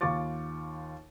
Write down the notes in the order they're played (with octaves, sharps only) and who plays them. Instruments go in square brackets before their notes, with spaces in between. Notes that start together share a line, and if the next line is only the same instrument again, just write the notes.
[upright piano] D#2 F4 C#6 D6 A6